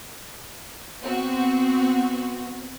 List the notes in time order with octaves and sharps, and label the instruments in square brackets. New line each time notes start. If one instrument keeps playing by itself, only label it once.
[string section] B3 C4 F#4